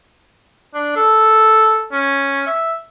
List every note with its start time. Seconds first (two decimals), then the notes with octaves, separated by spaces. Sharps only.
0.74 D4
0.96 A4
1.92 C#4
2.47 E5